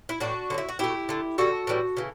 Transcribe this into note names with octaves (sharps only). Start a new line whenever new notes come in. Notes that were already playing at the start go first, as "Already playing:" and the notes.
E4
A2 E3 A3 D4 F#4
D3 F#3 A3
E4
F#4
B2 A3 E4 G4
D3 A3
D3 G3 F#4 A4
A2 E3 G3
C#3 E3